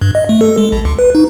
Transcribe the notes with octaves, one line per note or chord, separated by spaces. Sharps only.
G2
D#5
A3
A4
G#3
A#1
C#2
B4
D#4